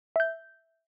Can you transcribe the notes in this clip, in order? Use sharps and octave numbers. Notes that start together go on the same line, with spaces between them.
E5 G6